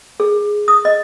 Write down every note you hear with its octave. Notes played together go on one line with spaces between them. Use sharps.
G#4
D#6
D#5